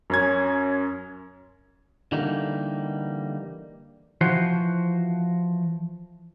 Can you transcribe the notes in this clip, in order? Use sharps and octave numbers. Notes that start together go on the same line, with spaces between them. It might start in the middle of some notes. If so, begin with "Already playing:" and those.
F#2 C#4 G#6
D3 E3 G3 A#3 D#4
E3 F3 F#4 C5